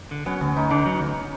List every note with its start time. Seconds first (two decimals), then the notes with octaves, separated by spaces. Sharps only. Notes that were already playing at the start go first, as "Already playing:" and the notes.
0.11 D3
0.26 F#3 B3 C#4
0.41 D2 B3 C#4
0.56 D2 C#4 D#4
0.70 D3 C#4 D#4
0.86 F#3
1.00 D2